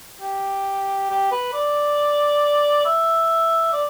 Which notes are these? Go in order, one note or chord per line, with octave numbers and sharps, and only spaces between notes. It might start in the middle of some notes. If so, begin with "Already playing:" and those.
G4
G4
B4
D5
E5
D5